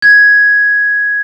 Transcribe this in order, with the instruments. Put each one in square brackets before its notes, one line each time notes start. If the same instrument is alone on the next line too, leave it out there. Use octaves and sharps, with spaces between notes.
[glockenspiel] G#6